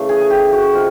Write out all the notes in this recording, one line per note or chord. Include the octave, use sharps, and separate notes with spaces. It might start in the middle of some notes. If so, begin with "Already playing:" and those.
Already playing: C#3 E3 A3
G#4
G#4
G4
F#4
C3 G#3 F4